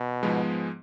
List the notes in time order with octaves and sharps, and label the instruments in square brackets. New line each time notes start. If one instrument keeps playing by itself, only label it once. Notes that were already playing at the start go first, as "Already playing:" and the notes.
Already playing: [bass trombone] B2
[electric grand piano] G#2 F3 G#3 B3